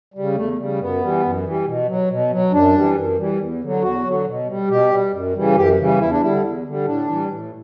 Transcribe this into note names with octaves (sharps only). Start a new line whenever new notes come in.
C#3 G3
E2 A3
C#3 G3
F#2 B3
E3 G3
F#2
E3 G3
B2
F#3
B2
F#3
F#2 D4
E3 G3
F#2
E3 G3
E2
D3 F#3
E2 F#4
D3 F#3
B2
G3
B2 G4
G3
F#2
C#3 E3 G3
F#2 G4
C#3 E3 G3
E2 E4
D4
D3 G3 E4
E2
D3 G3
A2 D4
E3 G3
A2